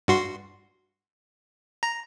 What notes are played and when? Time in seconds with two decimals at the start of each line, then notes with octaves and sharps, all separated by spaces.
0.08 G2 F#4 C6
1.83 A#5